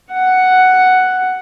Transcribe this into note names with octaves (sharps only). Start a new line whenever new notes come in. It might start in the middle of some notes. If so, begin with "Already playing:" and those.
F#5